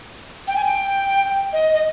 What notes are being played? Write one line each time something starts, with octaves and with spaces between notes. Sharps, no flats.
G5
G#5
G5
D#5
D#5